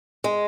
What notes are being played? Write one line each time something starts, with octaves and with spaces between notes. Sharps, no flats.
G#3